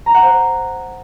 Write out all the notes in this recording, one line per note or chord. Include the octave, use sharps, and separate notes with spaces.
A#5
F#5
C5